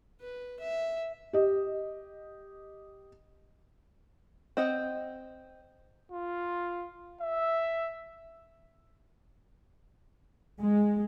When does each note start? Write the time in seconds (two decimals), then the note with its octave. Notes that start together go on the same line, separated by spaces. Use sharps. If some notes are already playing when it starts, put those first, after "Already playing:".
0.21 B4
0.60 E5
1.33 G4 D#5
4.57 C4 D#5 F#5
6.11 F4
7.20 E5
10.59 G#3